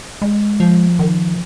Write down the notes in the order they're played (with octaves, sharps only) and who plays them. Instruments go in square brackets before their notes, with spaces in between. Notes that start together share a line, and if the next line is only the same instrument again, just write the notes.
[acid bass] G#3
[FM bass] F3
[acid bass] D#3